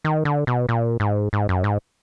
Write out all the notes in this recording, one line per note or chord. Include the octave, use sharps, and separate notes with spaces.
D#3
D3
B2
A#2
G#2
G#2
F#2
G#2